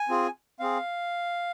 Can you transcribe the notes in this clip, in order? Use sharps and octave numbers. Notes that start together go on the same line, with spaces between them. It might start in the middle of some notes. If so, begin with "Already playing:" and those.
Already playing: G#5
C4 F4 G#4
C4 G#4 F5